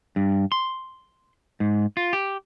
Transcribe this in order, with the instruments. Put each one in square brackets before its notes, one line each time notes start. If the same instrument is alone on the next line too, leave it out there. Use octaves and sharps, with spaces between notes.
[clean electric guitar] G2
C6
G#2
F4
G4